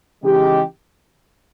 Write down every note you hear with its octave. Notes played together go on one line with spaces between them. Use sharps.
C#3 E3 G#3 D#4 G4